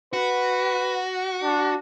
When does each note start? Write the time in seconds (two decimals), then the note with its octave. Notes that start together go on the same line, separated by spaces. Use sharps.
0.13 F#4 B4
1.43 D4